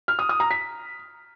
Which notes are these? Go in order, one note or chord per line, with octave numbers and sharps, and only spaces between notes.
F6
D#6
D#6
A#5
B6